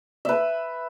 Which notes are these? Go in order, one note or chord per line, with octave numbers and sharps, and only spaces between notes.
B4 E5